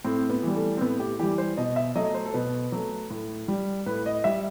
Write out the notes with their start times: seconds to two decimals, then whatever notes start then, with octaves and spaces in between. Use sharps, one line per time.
0.05 A2 C4
0.30 B3
0.43 E3 G3
0.56 A3
0.77 C4
0.81 A2 B3
1.00 G4
1.19 E3 G3 G4
1.38 C5
1.57 B2 D#5
1.76 E5
1.95 F#3 A3 D#5
2.14 C5
2.26 A4
2.34 B2 B4
2.72 F#3 A3
3.10 A2
3.48 G3
3.86 A2 B4
4.06 D#5
4.24 G3 E5